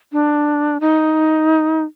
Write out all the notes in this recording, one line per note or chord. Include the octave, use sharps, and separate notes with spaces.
D4
D#4